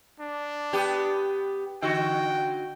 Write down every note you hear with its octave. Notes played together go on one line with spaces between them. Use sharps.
D4
B3 G4
D3 F#4 G5